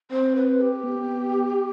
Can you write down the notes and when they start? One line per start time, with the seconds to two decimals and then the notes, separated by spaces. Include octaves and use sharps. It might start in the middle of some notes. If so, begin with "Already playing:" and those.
0.11 C4 C5
0.35 B4
0.61 G4
0.84 B3